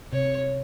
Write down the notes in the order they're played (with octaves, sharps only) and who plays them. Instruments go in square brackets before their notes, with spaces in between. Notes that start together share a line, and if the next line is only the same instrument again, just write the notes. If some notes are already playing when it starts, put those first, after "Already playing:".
[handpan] C3 [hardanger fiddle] C#5